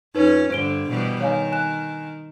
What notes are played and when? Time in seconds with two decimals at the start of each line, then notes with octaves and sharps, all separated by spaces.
0.15 F2 C#4 D#4 B4
0.51 G2 D3 C5 D7 G7
0.90 B2 E3 G3
1.21 D#3 C#5 F5 G#5
1.52 G#5 F#6 E7